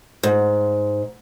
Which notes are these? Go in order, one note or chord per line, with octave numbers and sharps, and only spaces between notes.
G#2